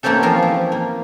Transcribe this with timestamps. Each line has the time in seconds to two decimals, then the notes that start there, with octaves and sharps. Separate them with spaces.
0.03 A3 A#3 C4 C#4 G4 A4
0.23 E3 F3 F4 A#4
0.43 E4
0.72 A#3